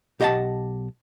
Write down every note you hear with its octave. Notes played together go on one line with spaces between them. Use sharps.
B1 G4 D#5 E5 F#5 A5